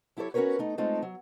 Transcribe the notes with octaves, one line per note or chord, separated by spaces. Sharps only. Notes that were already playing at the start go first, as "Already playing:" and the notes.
F#3 E4 G4 A4 C#5
C#4 F#4 G4 A#4 B4 C#5
A3 D#4
G#3 A3 C4 D#4 F4 A4
F#3